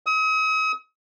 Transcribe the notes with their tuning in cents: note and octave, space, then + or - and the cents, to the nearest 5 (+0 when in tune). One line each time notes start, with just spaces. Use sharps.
D#6 +40